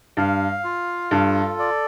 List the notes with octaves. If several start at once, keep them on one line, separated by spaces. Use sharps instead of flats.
G2 F5
F4
G2 A4
D5